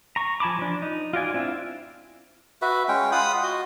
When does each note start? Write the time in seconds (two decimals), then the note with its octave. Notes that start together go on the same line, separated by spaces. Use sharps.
0.16 A#5 C#6
0.40 F3 G#5 A5 B5 D6
0.59 F3 D4
0.82 D#4
1.13 F4 F#4 D5 G#5
1.34 C4 D4 E4 F4
2.62 F#4 B4 E5
2.88 G#3 C#4 G5
3.12 F4 F#5 B5 D#6
3.43 F#4 D#5